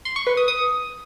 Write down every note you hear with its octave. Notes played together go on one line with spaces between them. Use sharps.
C6
C#6
B4
D#6
D#6